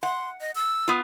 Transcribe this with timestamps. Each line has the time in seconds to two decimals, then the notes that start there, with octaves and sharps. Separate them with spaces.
0.03 F#5 C6
0.41 D#5
0.55 E6
0.88 B3 F4